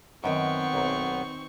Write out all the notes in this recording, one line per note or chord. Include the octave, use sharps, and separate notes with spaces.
F#2 D#3 B3 C4 D#4 G5 C#6
B1 F#2